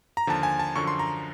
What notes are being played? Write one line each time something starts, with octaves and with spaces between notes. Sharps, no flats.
A#5
D#2 D3 F3 A5
G#5
A5
F#2 D3 F3 C#6
C6
A#5